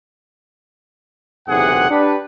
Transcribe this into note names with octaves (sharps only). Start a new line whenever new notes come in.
F#1 B1 E2 C3 G#4 F#5
D4 G4 B4